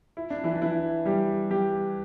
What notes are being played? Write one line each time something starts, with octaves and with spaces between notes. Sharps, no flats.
E4
D4
E3 E4
D4
E3 E4
G3 G4
G3 G4